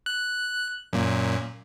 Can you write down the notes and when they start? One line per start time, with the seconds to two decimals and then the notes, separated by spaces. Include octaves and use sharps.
0.06 F#6
0.93 F#2 A#2